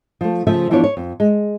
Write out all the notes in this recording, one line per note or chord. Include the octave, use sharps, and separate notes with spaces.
F3 A3
C#3 F3 A3 C5 E5
E3 F3 B3 D4 E4 C#5
C#5
F2
G#3